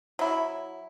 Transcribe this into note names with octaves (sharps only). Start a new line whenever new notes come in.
F#3 E4